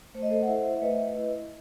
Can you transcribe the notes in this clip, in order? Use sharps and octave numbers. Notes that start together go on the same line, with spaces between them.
A3 C5
D#5
A4 C5
F#5
E4 C5 E5
E5
A3 B4 D#5
E4